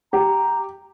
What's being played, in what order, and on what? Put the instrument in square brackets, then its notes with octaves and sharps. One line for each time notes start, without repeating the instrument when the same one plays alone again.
[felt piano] G4 [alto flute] A#5